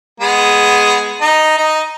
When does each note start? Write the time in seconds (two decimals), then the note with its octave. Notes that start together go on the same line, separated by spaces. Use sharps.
0.20 G#3 B3
1.21 D#4
1.58 D#4